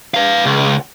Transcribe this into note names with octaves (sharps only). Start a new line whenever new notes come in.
B4 F5
C#2